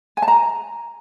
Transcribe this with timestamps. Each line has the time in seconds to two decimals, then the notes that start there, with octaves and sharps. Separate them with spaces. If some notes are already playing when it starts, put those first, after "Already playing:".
0.17 G#5
0.22 A5
0.28 A#5